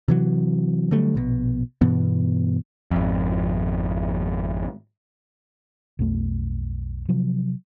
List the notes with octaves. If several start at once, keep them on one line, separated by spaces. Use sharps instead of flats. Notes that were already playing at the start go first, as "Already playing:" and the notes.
C3 E3 F#3
D3 F#3 G3 A3
A#1 B2
G2 B2 E3 B3
G#1 F2
B1 F2 A3
C3 F3 F#3